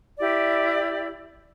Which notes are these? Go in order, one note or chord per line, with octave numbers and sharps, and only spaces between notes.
E4 G4 D5